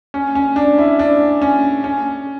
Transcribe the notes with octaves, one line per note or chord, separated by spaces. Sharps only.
C#4
C#4
D4
E4
D4
C#4
C#4